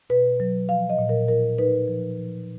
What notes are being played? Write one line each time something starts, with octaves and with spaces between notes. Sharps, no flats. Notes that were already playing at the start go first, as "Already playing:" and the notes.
B2 B4
F#3
F3 F5
D#5
A#2
A#4
D#4 A#4
D#4 B4
F3
F3